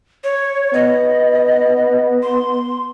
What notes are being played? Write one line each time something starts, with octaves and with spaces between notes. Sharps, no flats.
C#5
B3 D#5
C6